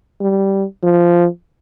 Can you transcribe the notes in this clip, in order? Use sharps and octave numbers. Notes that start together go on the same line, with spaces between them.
G3
F3